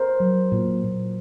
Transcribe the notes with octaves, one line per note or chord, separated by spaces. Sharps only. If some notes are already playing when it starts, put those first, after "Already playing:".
Already playing: A#4 C5
F#3
A#2
A#2